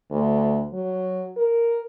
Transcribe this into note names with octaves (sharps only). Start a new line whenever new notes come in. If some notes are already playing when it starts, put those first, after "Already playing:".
D2
F#3
A#4